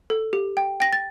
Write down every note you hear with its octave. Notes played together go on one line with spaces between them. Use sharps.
A4
G4
G5
G5 A#6
A6